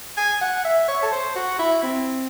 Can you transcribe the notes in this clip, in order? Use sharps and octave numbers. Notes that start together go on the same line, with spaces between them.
G#5
F#5
E5
C#5
A4
C5
F#4
E4
C4